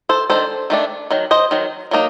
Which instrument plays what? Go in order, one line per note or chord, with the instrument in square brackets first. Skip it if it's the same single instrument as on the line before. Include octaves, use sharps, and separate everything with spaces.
[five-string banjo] A4 C5
D#3 A3 D4 A4 C5
D#3 A3 D4
D#3 F#3
C5 D#5
D#3 F#3
F#3 A#3 D#4